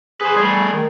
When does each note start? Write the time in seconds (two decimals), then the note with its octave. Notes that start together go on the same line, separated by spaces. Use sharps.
0.21 G#4 B4 C5
0.37 G3 A3 G#4
0.73 D#3